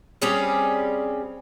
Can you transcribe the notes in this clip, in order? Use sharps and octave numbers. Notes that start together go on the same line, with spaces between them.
G3 C4 C#4 G#4